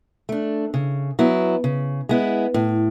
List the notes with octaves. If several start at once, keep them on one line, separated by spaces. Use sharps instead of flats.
A3 D4
C#3
F#3 B3 E4
C#3
G#3 B3 E4
A2